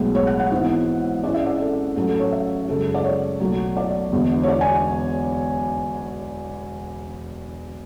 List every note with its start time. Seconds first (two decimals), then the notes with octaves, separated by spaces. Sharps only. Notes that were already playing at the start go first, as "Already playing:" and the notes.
Already playing: B1 A2 G#3 B3
0.15 C#5
0.27 F#5
0.40 F#5
0.51 G#1 G#2 E3 B3 E4
1.24 G#2 G#3 C#4 E4 D5
1.34 E5
1.46 D5
1.60 A4
1.96 A1 A2 F#3 C#4 A4
2.08 A4
2.20 C#5
2.32 E5
2.69 F#2 C#3 G#3 A4
2.94 D5
3.04 C#5
3.40 B1 B2 F#3 A3
3.77 D5
4.12 E1 E2 D3
4.43 C#5
4.48 D5
4.61 G#5